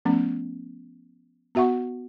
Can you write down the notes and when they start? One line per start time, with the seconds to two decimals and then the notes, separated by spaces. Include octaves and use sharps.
0.05 F3 A3 B3 C#4
1.55 B3 F#4 E5 F#5 C#6